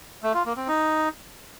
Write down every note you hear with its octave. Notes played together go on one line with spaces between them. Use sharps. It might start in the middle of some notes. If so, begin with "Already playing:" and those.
A3
F4
A#3
C4
D#4